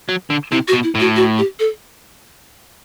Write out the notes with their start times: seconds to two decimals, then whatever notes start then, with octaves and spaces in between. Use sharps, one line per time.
0.09 F#3
0.30 D3
0.52 C3 E4
0.68 F#4
0.73 B2
0.83 E4
0.95 A2
1.00 F#4
1.16 F#4
1.38 G4
1.60 A4